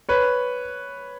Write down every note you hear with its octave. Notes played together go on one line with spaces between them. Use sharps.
B4 C#5